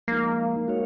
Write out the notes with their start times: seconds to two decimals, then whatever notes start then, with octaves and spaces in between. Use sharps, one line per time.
0.08 F3 G#3 A#3 D#4
0.68 G#3 D#4 F#4 C#5 F5